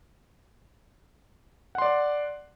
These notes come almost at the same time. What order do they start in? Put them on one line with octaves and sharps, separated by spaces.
F#5 C6 D5